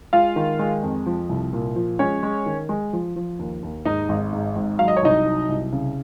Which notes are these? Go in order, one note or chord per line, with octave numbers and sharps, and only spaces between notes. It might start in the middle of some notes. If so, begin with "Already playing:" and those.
G#3 F4 F5
D#3
G#3
F2
F3
C2
A#2
F3
G#3 C#4 C#5
G#3
D#3
G#3
F3
F3
D#2
D#2
G#2 D#4 D#5
G#1
G#2
G#1
F#3 F5
D#5
C#5
C2 D#4 D#5
F#3
C2
C#3